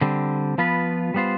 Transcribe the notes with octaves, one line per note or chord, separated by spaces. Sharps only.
D3 G3 C4
F3 B3 F4 B4
G3 B3 F4 C5